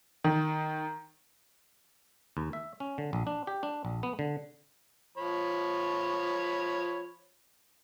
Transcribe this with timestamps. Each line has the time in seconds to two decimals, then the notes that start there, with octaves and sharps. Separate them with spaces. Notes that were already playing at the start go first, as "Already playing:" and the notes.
0.24 D#3
2.37 D#2
2.53 E5
2.80 C#4
2.98 D3
3.13 A#1
3.27 D4
3.47 G4
3.63 D4
3.85 A#1
4.03 B3
4.19 D3
5.17 F3 C#5 B5